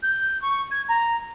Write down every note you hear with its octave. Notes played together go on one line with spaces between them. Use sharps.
G6
C#6
G#6
A#5